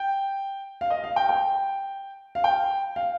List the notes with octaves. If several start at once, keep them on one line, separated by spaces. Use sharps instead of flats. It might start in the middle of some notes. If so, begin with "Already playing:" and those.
Already playing: G5
F5
D#5
F5
G5
G5
F5
G5
F5